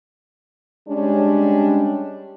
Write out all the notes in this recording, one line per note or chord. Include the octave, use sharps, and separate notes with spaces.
G3 G#3 C#4 D4